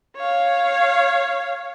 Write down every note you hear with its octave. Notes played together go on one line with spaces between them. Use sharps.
C#5 F5